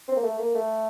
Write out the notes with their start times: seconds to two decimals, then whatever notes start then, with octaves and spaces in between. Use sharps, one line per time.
0.08 C4
0.16 A#3
0.23 A3
0.39 A#3
0.55 A3